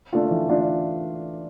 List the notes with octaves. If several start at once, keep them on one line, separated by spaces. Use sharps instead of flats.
A3 D4 F4
E3
A3 D4 F4